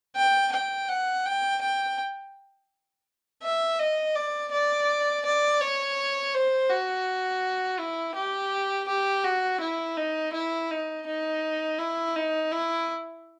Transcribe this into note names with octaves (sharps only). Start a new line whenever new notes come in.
G5
G5
F#5
G5
G5
E5
D#5
D5
D5
D5
C#5
C5
F#4
E4
G4
G4
F#4
E4
D#4
E4
D#4
D#4
E4
D#4
E4